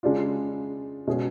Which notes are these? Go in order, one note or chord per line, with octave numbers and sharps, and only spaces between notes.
C#3 G#3 D4 F4
B2 G#3 C#4 G#4